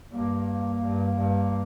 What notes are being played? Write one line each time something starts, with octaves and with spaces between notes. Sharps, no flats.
G2 A#3
G2
G2